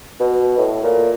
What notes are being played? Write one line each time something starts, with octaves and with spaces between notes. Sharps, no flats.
B2
A2
A#2